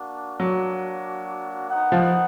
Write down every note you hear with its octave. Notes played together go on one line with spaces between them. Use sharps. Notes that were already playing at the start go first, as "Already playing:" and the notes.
Already playing: A#3 D4 F#4
F#3
B3 D#4 A#4 D#5 F#5
F3